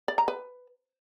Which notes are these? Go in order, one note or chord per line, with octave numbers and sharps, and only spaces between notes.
D5
A#5
B4